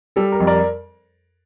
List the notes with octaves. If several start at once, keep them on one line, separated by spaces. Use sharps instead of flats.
G3 A4
A#4
F2
A#4 D5